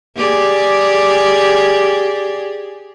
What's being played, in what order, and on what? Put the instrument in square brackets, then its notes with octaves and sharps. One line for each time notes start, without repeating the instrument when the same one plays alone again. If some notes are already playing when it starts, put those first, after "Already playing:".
[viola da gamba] G4 G#4 D5